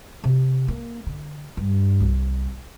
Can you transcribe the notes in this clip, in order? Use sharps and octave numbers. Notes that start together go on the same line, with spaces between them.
C3
A#3
D3
G2
C2